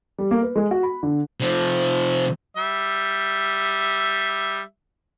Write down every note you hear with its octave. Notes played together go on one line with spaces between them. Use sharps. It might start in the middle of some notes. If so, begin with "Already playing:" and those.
G3
A#3
B4
G#3
F#4
B5
D3
C3 F3
G3 E5